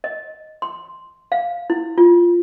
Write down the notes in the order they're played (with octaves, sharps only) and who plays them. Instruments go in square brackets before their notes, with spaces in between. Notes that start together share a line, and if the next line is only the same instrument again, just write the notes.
[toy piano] D#5
C6
F5
E4
F4